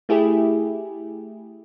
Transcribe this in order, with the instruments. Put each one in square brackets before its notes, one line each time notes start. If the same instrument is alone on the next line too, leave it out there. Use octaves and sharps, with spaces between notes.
[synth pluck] A3 E4 G4 G#4